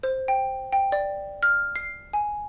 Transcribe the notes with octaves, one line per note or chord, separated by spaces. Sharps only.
C5
G5
G5
D5
F6
C7
G#5